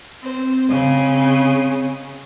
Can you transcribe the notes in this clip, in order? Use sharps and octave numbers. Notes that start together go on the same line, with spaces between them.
C4 C5
C#3 G#3 C#4